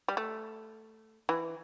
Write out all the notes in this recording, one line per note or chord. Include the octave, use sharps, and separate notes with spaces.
G3
A3
E3